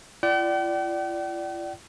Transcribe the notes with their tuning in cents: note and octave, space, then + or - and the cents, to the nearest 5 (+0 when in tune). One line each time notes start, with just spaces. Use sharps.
F4 -45 D5 +0 G5 -45